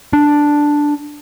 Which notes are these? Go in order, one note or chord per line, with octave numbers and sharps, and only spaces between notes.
D4